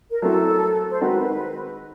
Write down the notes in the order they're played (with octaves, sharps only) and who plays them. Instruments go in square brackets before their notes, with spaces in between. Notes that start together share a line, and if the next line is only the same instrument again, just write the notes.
[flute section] A#4
[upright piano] F#3 A3 C4 E4 [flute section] A4
[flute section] C5
[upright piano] D#3 G#3 C4 D#4 F#4 [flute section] B4